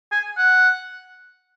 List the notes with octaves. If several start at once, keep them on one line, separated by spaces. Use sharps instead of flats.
G#5
F#5